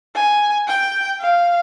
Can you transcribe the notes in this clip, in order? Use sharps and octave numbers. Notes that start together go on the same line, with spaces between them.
G#5
G5
F5